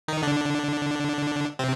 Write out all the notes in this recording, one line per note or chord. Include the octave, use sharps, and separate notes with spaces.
D#3 D#4
D3 D4
C3 C4